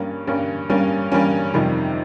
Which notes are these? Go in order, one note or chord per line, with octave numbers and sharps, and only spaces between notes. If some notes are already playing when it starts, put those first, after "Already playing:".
Already playing: G2 G3 A#3 C#4
G2 G3 A#3 C#4
G2 G3 A#3 C#4
G2 G3 A#3 C#4
F2 C3 D#3 G3